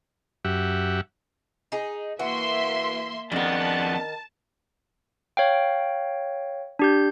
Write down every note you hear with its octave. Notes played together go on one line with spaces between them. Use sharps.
F#2 G4 E5 F#5
D#4 G#4
E3 A#3 F#4 E5 C6
F2 D#3 B3 D4 A#4 A5
C#5 F5 G5
D4 G4 G6